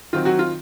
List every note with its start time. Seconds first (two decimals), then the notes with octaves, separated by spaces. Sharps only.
0.13 D#3 F#3 C4 F4
0.25 F#3 F#4
0.39 F4